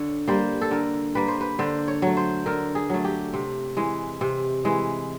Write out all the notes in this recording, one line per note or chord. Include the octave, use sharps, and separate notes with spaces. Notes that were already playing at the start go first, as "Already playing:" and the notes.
Already playing: D3 C#5
G3 A#3 C5
A4
D3 A#4
G3 A#3 B4
C5
B4
D3 C5
C#5
F#3 A3
C5
D3 A#4
G#4
F#3 A3
G4
C3
E3 G#3
C3
E3 G#3